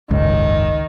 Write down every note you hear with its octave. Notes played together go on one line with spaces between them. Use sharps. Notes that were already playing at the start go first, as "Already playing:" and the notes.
F#1 C#2 G#2 D#3